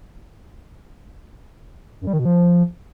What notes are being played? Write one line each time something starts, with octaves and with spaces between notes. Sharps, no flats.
F#2
G3
D#3
B2
F3